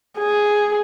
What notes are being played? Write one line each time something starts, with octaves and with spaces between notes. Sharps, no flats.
G#4